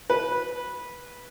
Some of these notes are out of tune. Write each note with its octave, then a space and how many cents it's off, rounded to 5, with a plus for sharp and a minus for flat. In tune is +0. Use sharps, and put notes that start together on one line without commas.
B4 -15